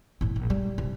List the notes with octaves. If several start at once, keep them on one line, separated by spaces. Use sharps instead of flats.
A2 E4
A#1
G3
C3